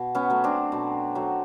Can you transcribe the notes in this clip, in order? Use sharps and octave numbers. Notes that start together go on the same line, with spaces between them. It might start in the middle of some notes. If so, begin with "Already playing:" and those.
Already playing: B2
B3 C#4
F#3 A3
C4 D4
B2
F#3 A3